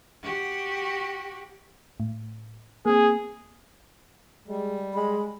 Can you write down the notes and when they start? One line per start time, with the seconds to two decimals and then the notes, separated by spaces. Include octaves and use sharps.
0.22 F#4 G4
2.00 A2
2.86 A#3 C4 G#4
4.47 G3 G#3
4.94 G#3 B5